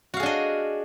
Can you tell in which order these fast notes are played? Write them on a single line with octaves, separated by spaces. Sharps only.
F#4 F5 G#4 D4 D#5